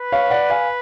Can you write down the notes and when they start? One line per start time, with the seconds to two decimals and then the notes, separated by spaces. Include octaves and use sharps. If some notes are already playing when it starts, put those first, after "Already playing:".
Already playing: B4
0.12 C#5 F5
0.30 D5 F#5
0.50 F5 G#5